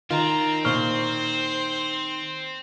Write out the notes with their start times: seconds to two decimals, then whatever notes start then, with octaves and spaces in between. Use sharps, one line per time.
0.10 D#3 C4 F4 A#5
0.65 A#2 C5 C#6 F6